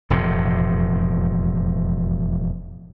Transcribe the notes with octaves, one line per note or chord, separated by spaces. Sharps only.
E1 F2 A2 C3